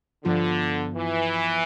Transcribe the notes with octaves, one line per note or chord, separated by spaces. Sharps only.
G2 D3 F3 B3 F4
E3